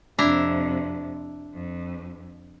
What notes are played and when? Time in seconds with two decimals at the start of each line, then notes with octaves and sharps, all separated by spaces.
0.19 F2 C3 D4 E4 A#5
1.54 F2